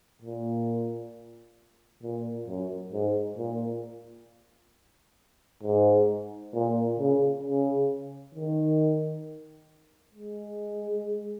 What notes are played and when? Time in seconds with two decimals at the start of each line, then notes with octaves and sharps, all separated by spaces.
0.22 A#2
2.03 A#2
2.47 F#2
2.93 G#2
3.38 A#2
5.63 G#2
6.53 A#2
6.99 C#3
7.43 C#3
8.35 D#3
10.15 G#3